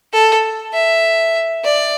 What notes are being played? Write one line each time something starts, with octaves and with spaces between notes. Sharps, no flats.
A4
E5
D5